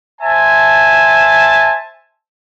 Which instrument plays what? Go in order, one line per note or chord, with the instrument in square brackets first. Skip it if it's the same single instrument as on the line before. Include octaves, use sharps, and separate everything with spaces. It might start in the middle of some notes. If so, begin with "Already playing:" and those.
[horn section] C5 E5 G#5 A5